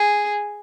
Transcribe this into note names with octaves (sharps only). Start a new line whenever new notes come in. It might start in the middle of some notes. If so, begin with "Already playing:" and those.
Already playing: G#4